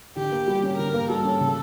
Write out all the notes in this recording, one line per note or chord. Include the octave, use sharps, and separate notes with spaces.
D3 G4
A#3
G3
C#4
D3 A#4
A#3
G3 A4
C#4
C#3